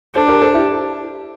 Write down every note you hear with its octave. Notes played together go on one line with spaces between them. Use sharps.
D4 A4 C5
G4 A#4
A4 C5
E4 G4